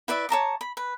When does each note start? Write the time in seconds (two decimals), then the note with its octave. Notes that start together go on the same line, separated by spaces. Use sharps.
0.08 E4 B4 D5 E5
0.29 C#5 A5 A#5 D6
0.61 B5
0.77 B4